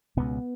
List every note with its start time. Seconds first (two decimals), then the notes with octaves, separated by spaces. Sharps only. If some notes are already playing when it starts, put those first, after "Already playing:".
0.17 C#2 B2 B3